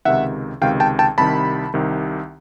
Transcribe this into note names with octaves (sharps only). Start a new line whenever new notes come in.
C#2 C3 D#3 E5 F#5
C#2 C3 D#3 F5 G5
G5 A5
G5 A5
C2 C3 D#3 A5 B5
C2 C3 D#3